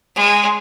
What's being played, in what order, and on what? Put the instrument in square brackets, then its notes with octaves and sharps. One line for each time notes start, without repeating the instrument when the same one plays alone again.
[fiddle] G#3